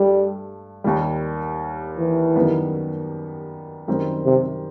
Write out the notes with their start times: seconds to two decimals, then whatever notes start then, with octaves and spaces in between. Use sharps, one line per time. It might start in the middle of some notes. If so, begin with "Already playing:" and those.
Already playing: G2 G3 A3
0.84 D#2 D#3 G3
1.97 E3
2.36 F#2 D#3 G3 B3
3.88 F#2 D#3 G3 C4
4.25 C3